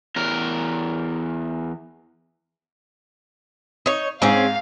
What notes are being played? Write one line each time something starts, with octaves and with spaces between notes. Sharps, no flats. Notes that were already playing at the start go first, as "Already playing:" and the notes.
E2 A#4
D#4 C#5
G#2 C4 C#4 G#4 F5